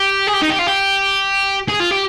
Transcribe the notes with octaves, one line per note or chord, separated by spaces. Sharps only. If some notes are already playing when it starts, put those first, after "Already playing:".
Already playing: G4
G#4
G4
D#4
G4
F4
G4
G#4
F4
G4